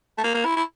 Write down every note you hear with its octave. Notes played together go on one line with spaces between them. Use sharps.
A3
A#3
A#3
E4
E4